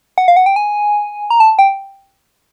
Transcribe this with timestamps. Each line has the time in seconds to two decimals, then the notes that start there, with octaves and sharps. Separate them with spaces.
0.18 F#5
0.28 F5
0.36 F#5
0.46 G5
0.56 G#5
1.30 A#5
1.40 A5
1.59 G5